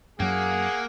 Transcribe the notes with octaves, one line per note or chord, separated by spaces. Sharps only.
F#2 F#3 A#3 G#4 F#5